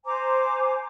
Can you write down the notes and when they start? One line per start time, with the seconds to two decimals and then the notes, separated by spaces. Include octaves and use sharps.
0.05 C5 G#5 A#5 D6